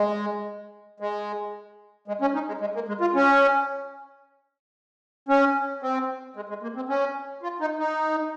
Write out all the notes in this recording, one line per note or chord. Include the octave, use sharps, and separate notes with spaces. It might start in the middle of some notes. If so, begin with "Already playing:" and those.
Already playing: G#3
G#3
G#3
C#4
D#4
G#3
G#3
A#3
G#3
F4
C#4
C#4
C4
G#3
G#3
A#3
C4
C#4
F4
D#4
D#4